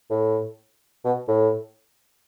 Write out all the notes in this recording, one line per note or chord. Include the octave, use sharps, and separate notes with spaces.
A2
B2
A2